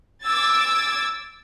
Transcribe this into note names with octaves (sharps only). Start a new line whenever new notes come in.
D6 E6 G#6 A6